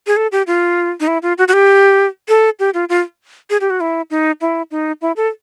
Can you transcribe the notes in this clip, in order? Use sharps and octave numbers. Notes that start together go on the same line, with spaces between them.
G#4
A4
G4
F4
D#4
E4
F4
F#4
F#4
G4
A4
G4
F4
F4
G#4
G4
F#4
E4
D#4
E4
D#4
E4
A4